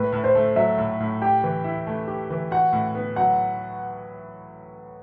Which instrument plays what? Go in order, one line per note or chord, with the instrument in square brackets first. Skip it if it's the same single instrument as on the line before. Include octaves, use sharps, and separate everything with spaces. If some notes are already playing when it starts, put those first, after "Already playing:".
Already playing: [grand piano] A2 [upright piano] B4
[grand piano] A2
[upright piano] C5
[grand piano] A3
[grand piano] F#3 [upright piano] E5
[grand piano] A2
A2
[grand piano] G4 [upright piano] G5
[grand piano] E3
E4
A3
G4
E3
[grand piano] F#4 [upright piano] F#5
[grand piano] A2
B3
[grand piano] F#3 [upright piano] F#5